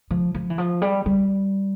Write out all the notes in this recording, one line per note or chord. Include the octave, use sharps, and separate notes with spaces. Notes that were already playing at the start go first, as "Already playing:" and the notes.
F3
F3
E3
F3
G3
G3